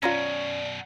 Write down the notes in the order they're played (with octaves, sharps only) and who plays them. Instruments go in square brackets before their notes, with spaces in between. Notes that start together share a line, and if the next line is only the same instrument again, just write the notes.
[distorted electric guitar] F#2 B2 [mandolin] C#4 [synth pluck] F4 A#5 A#6 [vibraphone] D5